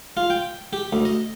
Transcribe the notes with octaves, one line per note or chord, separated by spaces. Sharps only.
F4
G5
G4
D2
D#5